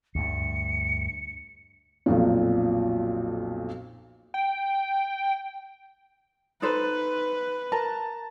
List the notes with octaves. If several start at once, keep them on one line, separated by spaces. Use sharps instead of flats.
D2 G2 C#7
B1 F2 A#2
G5
D#4 A4 B4 C5
A#4 A5